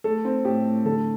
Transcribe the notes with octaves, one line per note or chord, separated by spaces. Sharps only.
A3 A4
C4
A2 G4
A2
D3 A4